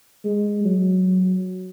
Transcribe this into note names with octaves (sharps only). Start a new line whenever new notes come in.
G#3
F#3